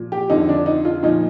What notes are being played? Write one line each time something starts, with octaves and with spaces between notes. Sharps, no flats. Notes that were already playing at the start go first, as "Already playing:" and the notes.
Already playing: A#2 F3
G4
F2 D3 F3 D#4
D4
D#4
F4
A#2 F3 D#4